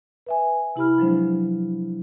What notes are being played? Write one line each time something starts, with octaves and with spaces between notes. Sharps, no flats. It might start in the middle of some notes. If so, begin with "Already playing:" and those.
B4 E5 G#5
C3 E4 G4 B5 F6
F3 F#3 G#3 D4 C5